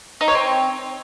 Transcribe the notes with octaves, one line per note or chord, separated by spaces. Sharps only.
D#4
C#5
C4